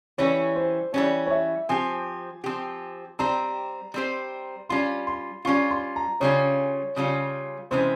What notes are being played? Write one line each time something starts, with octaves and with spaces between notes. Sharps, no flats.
E3 G3 C#4 C#5
C5
E3 G3 C#4 C#5
C#5
E5
F3 C4 G4 G#5
F3 C4 G4
G3 C4 G4 C5 A#5
G3 C4 G4 C5
G3 C#4 F4 C6
C6
G3 C#4 F4 C#6
C6
A#5
C#3 G3 C#4 F4 C#5
C#3 G3 C#4 F4
C3 E3 G#3 C#4 C5